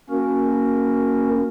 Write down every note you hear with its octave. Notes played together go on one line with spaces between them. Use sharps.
A#3 C#4 F#4 A#4